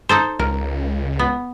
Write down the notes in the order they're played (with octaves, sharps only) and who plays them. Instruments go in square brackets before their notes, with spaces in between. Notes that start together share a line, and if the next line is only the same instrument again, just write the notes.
[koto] D#4 A4 C5
[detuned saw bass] C#2 [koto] A#4
[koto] B3